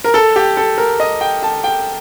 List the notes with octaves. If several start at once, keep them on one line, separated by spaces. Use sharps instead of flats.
A#4
A4
G4
A4
A#4
D#5
G5
A5
G5